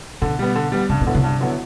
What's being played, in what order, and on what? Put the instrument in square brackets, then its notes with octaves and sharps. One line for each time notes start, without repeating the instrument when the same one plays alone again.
[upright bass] B2 [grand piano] D3
[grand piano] G3 B3
D3
G3 B3
[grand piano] G2 [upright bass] C3
[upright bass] B2
[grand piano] D3 F#3 B3 E4
[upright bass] C3
[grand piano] G2
D3 F#3 B3 E4